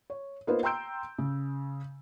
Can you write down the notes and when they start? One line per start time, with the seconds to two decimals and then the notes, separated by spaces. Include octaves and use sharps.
0.10 C#5
0.47 A#3 B3 D#4 F4 B4 C5
0.63 G5 A#5 C6 E6 G6 D7
1.19 C#3